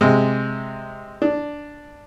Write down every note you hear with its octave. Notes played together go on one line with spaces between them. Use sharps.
C3 G#3
D4